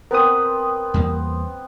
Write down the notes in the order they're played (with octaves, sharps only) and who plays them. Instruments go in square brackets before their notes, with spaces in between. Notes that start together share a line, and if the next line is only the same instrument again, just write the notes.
[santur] B3 C4 B4 [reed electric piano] A#4 D#6
[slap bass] E2 G3 A#3